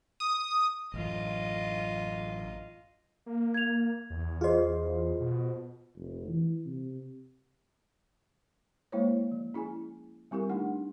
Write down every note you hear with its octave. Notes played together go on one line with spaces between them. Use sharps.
D#6
A1 F#2 F4 D#5
A#3
G#6 F7
E2
F4 G#4 C5 D#5
B2
F1
E3
C3
G#3 A#3 E4 C5 C#5
F3
C#4 E4 G#4 G#5
G3 C4 E4 G4 A#4
A3 D4 D#4 F#5